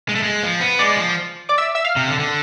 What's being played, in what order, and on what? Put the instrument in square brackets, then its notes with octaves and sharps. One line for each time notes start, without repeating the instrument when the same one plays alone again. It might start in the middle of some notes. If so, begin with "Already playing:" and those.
[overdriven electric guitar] G#3
A3
G#3
F3
B3
[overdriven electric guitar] G#3 [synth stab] D5 D6
[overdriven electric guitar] F3
[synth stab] D5 D6
E5 E6
E5 E6
F5 F6
[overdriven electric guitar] C3
D3
D3